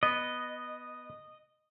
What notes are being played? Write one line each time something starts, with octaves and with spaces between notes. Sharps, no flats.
B3 D#5